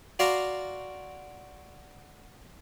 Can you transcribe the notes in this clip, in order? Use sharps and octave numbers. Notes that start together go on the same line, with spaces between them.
F#4 D5 F5 A5 A#5 C6